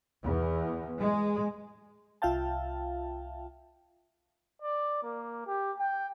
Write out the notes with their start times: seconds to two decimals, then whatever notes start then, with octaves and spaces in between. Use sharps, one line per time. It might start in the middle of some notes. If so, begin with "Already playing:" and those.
0.21 E2
0.98 G#3
2.22 C2 F4 E5 F5 G5 A5
4.62 D5
5.03 A#3
5.46 G4
5.79 G5